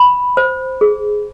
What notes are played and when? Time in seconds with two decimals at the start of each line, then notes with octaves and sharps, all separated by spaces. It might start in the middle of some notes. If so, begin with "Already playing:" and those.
Already playing: B5
0.37 C5
0.81 G#4